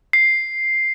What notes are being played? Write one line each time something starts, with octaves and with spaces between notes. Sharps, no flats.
C7